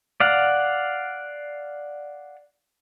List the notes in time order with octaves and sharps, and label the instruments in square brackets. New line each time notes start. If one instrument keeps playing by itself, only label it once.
[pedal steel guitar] D5 F5 F#5